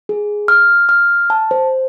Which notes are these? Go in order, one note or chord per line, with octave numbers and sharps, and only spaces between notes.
G#4
F6
F6
A5
C5